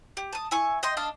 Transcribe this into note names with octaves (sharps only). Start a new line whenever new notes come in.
G4
A5 D#6
E4 G#5 C#6
D#5 G5 C6
D4 D#5 F5 A5